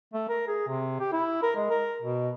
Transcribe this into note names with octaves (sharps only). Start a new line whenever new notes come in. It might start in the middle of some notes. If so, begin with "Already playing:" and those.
A3
A#4
G#4
C3
G4
E4
A#4
G#3
A#4
B2